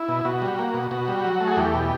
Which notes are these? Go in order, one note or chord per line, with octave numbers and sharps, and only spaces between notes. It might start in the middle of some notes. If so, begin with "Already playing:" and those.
Already playing: E4
B2
B2 F#4
G3
A#3
B2
B2 F#4
G3
F#3
A3
G#4
E2 G4
B2